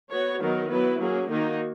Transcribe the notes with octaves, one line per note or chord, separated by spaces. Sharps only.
B3 F#4 C#5
D#3 F#3 B3 D#4 A#4
F#3 B3 E4 B4
F#3 A#3 C#4 G#4
D#3 A#3 D#4 F#4